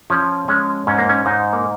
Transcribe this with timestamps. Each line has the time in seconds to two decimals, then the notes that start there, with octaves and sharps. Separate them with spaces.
0.10 F3 C#4
0.48 G#3 C#4
0.87 G#2 C#4
0.98 A#3
1.09 C#4
1.26 G#2 D#4
1.53 A#3